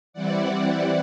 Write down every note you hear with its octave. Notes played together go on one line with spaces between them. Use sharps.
E3 G3 C4 E4 D5 F#5